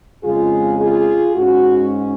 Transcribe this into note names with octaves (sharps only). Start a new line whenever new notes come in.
F2 C#3 G#3 F4 G#4
F4 G#4
G#2 G#3 C#4 F#4